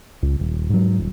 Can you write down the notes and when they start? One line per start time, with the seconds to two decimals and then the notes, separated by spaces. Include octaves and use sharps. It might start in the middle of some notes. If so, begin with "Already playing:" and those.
0.23 C#2
0.39 D#1
0.70 G#2 F#3
0.98 D#1